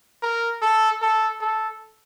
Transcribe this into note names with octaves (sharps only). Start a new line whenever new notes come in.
A#4
A4
A4
A4